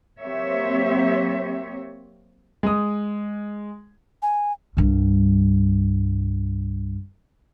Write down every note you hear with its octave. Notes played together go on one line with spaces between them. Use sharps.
F#3 A#3 C4 G4 C#5 E5
G#3 D#6
G#5
C2 G2